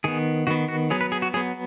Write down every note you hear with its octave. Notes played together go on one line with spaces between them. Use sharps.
D#3 B3 G#4
D#3 B3 F#4
F#4
F#3 B3 G#4
B4
G#4
F#4
F#3 B3 G#4